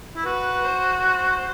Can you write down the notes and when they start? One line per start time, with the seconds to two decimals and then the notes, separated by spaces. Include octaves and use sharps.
0.16 E4
0.25 F#4 B4
0.65 C5
1.04 C5